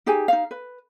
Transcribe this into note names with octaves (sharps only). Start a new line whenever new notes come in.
D#4 G4 G#4 G#5
D#4 F5
B4